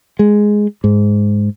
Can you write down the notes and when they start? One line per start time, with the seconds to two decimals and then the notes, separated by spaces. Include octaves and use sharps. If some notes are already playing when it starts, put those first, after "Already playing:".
0.19 G#3
0.84 G#2